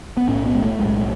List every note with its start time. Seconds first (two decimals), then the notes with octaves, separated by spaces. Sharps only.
0.17 B3
0.28 B1 A2 C#4
0.46 B3
0.54 G#3
0.61 A3
0.79 B1 A2 G#3